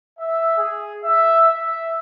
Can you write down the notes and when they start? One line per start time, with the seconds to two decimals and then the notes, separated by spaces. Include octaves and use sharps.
0.18 E5
0.58 G#4
1.04 E5
1.47 E5